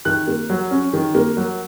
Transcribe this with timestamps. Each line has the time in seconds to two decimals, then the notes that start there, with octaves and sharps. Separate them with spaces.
0.05 D#3 F#6
0.27 A#3
0.50 F#3
0.71 C#4
0.93 D#3
1.15 A#3
1.37 F#3